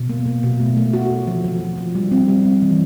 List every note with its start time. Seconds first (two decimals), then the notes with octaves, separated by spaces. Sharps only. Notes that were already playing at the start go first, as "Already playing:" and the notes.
Already playing: B2
0.09 A#3
0.26 A#3
0.43 B2
0.60 A3
0.77 A3
0.93 F#4
1.11 A3
1.27 F3
1.44 F3
1.61 F3
1.78 F3
1.95 G3
2.11 C4
2.28 G3
2.45 C4
2.62 E3